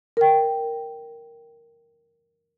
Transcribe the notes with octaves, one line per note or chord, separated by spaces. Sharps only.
A#4 G5